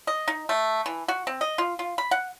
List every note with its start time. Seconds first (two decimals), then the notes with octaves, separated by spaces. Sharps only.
0.07 D#5
0.28 D#4
0.49 A3
0.86 E3
1.08 F#4
1.27 C4
1.41 D#5
1.58 F4
1.79 F4
1.98 B5
2.11 F#5